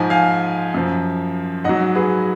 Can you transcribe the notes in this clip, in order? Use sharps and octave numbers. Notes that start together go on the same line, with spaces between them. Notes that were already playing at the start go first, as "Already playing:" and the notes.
Already playing: G#2 F3 G#5
F5 G#5
F#2 F3
G#2 F#3 D#5 F#5
G#4 B4